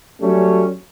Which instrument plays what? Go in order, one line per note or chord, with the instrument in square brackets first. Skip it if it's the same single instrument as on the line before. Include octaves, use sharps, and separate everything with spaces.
[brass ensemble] F#3 G3 A3 C#4